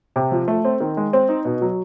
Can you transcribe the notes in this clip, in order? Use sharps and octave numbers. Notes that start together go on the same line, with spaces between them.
C3
F3
A3
C4
D#3
G#3
C4
D#4
B2
F#3